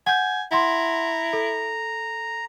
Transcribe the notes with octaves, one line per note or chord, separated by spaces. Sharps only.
F#5 G#5 G6
E4 F#5 A#5 C6
A4